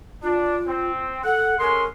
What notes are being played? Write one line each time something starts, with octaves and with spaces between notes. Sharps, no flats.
D4 F4
C4
A4 F#5
G#3 C#4 A#4 C6